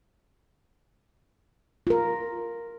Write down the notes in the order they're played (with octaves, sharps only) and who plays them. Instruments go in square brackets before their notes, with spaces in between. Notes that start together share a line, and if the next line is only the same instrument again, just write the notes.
[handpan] F4 A#4